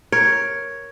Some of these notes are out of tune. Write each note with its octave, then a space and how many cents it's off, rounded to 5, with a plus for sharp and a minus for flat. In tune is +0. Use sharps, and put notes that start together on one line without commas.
A#4 +10 C#5 +0